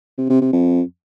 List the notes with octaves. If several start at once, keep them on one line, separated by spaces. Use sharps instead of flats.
C3
C3
C3
F2